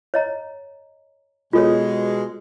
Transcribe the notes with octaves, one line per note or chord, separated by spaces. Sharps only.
C#5 D#5 A#5
B2 G#3 F4 A4 C#5